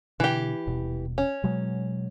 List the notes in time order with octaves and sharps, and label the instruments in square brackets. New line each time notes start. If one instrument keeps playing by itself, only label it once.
[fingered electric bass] B2 D3 [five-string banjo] E3 G4
[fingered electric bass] D#1 B2
[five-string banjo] C#4
[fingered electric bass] B2 F#3 G#3